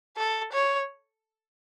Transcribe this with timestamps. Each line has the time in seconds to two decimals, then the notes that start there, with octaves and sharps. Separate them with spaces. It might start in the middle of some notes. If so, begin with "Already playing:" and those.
0.17 A4
0.53 C#5